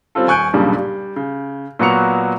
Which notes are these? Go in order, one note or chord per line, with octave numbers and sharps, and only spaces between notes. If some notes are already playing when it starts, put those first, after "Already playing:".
G3 C4 C#4 F4 A4
D#1 G#5 C#6 F#6 G6 D7
B1 G2 A#2 C#3 G3
G3
C#3
A#2 F#3 B3 F#4 C#7 F7